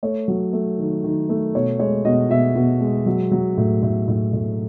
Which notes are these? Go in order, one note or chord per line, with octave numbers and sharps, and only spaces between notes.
A3 C#5
F#3
A3
D#3
D#3
A3
B2 C#5
G#3 C#5
B2 D#5
B2 E5
B2
G#3
F#3
F#3
A2
A2
A2
A2